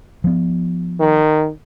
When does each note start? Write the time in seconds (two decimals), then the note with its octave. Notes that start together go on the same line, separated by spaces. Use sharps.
0.24 F3 B3
1.00 D#3